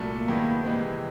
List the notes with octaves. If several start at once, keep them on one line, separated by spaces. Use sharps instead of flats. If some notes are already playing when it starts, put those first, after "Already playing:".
Already playing: C2 A#2 F#3 A3
A#3
G2 D#3 G#3 B3 E4
C3 E3 G#3 C4